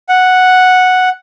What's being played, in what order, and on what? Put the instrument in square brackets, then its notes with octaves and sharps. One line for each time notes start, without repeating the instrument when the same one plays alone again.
[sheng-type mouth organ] F#5